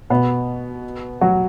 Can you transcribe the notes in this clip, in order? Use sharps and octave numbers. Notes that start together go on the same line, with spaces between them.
B2 B3
F#3 F#4